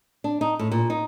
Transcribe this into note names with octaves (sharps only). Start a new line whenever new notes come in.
D4
D#4
A2
A#2
D#4